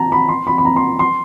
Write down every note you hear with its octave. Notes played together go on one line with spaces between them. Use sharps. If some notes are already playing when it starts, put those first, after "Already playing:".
Already playing: A5 A#5
B5
C6
B5
B5
A#5
C6
C6